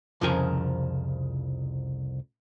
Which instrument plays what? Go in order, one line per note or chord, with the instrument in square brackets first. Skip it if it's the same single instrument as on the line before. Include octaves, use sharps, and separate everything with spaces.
[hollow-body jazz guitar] C2 F2 C#3 F3 A#4 G#5